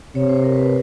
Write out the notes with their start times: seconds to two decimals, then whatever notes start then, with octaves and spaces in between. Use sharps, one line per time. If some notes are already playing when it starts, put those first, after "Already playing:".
0.15 C3 C#5
0.29 C5
0.44 A#4
0.53 B4
0.63 C5